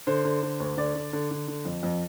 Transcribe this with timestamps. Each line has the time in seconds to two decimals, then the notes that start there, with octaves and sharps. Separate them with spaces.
0.07 D3 C5
0.25 D3
0.42 D3
0.60 D2
0.77 D3 D5
0.95 D3
1.13 D3
1.31 D3
1.48 D3
1.65 F2
1.83 F2